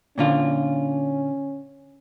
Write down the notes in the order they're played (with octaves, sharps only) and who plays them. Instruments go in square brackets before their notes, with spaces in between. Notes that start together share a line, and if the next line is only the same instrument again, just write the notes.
[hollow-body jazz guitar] A#2 D3 F4 [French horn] C#4